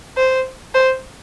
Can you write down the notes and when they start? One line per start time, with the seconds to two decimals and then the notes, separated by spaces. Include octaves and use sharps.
0.17 C5
0.75 C5